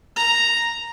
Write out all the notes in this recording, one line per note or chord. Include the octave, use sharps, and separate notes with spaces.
A#5